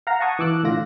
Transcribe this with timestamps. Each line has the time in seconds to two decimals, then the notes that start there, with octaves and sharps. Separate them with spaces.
0.07 F5 F#5 A#5
0.20 F#5 A5 C#6 D#6 G#6
0.39 E3 D6 E6 F#6
0.63 A2 D3 F4 A#6